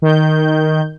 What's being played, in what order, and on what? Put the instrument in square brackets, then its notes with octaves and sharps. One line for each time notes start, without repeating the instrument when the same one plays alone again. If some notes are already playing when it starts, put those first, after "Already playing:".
[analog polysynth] D#3 G6